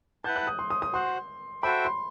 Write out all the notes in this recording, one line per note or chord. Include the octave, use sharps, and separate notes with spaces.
E4 B4 F#5 A5 G6
F#6
D#6
C6
D#6
D#6
F#4 C5 F#5 C6
F#4 A4 C5 E5 G5 B5
C6